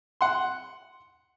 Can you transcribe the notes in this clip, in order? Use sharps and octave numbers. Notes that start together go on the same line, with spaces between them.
F#5 C6